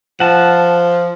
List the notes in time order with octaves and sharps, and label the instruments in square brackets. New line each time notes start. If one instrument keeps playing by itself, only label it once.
[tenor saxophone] F3 [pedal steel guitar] F#5 A5